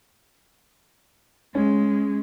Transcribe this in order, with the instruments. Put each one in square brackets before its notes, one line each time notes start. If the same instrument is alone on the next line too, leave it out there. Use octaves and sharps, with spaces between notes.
[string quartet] G#3 [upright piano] C#4